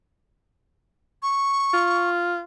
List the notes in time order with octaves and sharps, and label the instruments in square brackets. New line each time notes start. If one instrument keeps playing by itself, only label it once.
[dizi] C#6
[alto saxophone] F4